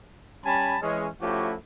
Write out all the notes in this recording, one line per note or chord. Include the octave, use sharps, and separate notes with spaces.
G3 C#4 G#5 A5 B5
E3 G#3 C#4
F3 A3 C#4 E4 F#4 G4